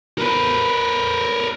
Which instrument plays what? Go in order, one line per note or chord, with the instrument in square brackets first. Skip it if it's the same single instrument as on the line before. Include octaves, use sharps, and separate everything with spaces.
[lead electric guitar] A#4 B4